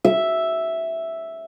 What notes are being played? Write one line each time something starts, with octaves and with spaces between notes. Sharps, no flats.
E5